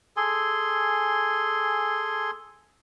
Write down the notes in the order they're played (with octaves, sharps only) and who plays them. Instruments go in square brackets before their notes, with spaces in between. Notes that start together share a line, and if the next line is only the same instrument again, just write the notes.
[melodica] G#4 A4 G#5 C6